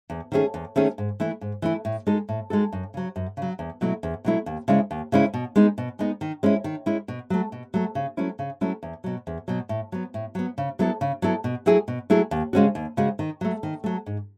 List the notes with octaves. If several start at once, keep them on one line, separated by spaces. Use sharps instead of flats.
E2
D#3 A3 C#4 G#4
E2
D#3 A3 C#4 G#4
G#2
E3 A3 E4
G#2
E3 A3 E4
A2
G#3 D#4 F#4 A4
A2
G#3 D#4 F#4 A4
F#2
C#3 F#3
F#2
C#3 F#3
E2
B2 F#3 A3 E4
E2
B2 F#3 A3 E4
D#2
C#3 G#3 C#4 E4
D#2
C#3 G#3 C#4 E4
B2
G#3 B3 D#4
B2
G#3 B3 D#4
D#3
G#3 C#4 E4
D#3
G#3 C#4 E4
B2
F#3 A3
B2
F#3 A3
C#3
F#3 A3 C#4 E4
C#3
F#3 A3 C#4 E4
E2
B2 F#3
E2
B2 F#3
A2
F#3 B3
A2
F#3 B3
C#3
F#3 B3 E4 A4
C#3
F#3 B3 E4 A4
B2
F#3 A3 E4 G#4
B2
F#3 A3 E4 G#4
D#2
C#3 G#3 C#4 F#4
D#2
C#3 G#3 C#4 F#4
D#3
F#3 A3
D#3
F#3 A3
G#2